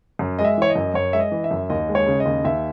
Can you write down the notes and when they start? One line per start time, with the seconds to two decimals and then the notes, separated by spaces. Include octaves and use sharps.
0.19 F#2
0.39 G#3 D#5
0.45 E5
0.58 E3 C#5
0.70 D#5
0.76 F#2
0.94 F#2 C#5
1.13 G#3 E5
1.20 D#5
1.32 E3
1.44 E5
1.51 F#2
1.70 D#2 D#5
1.89 G#3
1.95 C#5
2.06 C#3
2.20 D#5
2.25 D#2
2.44 D#2 E5